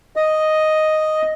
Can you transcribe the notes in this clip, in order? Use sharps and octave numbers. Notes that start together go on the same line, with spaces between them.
D#5